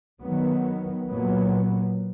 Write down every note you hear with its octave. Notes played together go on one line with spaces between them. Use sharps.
D#3 F#3 B3
A#2 F#3 B3